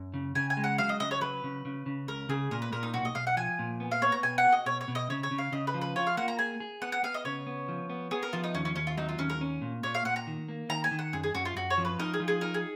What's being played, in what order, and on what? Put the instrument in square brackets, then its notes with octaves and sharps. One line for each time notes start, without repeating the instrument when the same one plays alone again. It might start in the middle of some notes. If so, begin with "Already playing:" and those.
Already playing: [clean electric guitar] F#2
C#3
[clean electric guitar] C#3 [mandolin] G#5
[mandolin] G#5
[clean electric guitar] G#3
[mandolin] F#5
[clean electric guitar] F#3 [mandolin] F5
[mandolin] D#5
[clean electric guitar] C#3 [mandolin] D#5
[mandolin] C#5
[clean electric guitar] F#3 [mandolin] B4
[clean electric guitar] C#3
C#3
C#3
[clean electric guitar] C#2 [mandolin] A#4
[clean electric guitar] C#3 [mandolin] G#4
[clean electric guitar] A#2 [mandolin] A#4
[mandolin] B4
[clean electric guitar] A#2 [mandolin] A#4
[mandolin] D#4
[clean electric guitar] B1 [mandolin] F#4
[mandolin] D#5
[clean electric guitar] B1 [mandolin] F5
[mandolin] F#5
[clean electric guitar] F3 [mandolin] G#5
[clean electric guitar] A#2
B3
[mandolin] F5
[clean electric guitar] B3 [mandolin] C#5
[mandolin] A#5
[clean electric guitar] B2 [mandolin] G#5
[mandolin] F#5
[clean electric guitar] F#4
[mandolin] D#5
[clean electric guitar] B2 [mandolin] C#5
[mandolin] C#5
[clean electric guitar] B2
[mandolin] D#5
[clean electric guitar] C#3 [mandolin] C#5
[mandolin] C#5
[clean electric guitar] C#3
[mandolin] F5
[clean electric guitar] C#3 [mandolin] D#5
[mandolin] B4
[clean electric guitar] F3
[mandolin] B4
[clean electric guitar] F4 [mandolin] C#5
[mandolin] F5
[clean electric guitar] A#3 [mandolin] F#5
[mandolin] A#5
[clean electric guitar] G#4 [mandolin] G#5
[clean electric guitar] G#4
[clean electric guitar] B3 [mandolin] F#5
[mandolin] F#5
[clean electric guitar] B3 [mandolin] F5
[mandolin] D#5
[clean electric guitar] C#3 [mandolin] C#5
[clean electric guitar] B3
F3
B3
[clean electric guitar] B3 [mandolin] G#4
[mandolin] A#4
[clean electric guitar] F3 [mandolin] F4
[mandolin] D#4
[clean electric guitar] D#2 [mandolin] C#4
[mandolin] C#4
[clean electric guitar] D#2 [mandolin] C#4
[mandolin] F4
[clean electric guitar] F#3 [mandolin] D#4
[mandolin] F4
[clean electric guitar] D#2 [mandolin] C#4
[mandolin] A#4
[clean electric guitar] C#4
A#2
[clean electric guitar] A#2 [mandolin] C#5
[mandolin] F5
[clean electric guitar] A#2 [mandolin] F#5
[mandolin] A#5
[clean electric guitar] D#3
A#3
[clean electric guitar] D#3 [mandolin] A#5
[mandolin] G#5
[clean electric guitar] D#3
[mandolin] F#5
[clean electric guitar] F#2 [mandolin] G#4
[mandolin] G#4
[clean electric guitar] F#2 [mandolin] F#4
[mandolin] F4
[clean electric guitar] F#2 [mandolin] F#4
[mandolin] C#5
[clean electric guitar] F3
[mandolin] B4
[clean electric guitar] D#4 [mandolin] A#4
[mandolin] G#4
[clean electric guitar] F3
[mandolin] G#4
[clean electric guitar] D#4 [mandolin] A#4
[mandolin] G#4